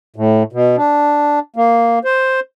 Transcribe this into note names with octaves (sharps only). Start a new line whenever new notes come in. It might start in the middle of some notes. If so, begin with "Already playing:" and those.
A2
B2
D4
A#3
C5